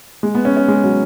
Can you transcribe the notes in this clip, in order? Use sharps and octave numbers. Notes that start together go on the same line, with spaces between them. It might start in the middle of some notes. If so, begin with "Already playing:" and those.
G#3
B3
C#4
C#4
G#3
F#3